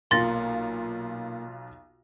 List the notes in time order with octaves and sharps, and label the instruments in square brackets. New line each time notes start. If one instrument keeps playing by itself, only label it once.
[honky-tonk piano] B1 F4 [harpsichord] A#2 [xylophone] C6 A6 A#6